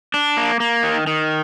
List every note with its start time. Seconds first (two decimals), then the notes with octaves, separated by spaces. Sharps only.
0.14 D4
0.37 A#3
0.60 A#3
0.83 D#3
1.07 D#3